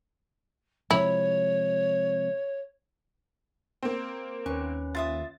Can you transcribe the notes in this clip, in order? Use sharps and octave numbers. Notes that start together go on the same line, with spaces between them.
C3 F3 G#3 E4 C#5
A#3 C4
D#2 C#4 B4 C#6
F4 E5 D#6 A6